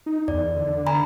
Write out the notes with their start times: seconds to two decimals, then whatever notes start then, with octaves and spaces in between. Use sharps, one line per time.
0.06 D#4
0.28 E2 D5
0.56 D3
0.86 G#5 A#5 B5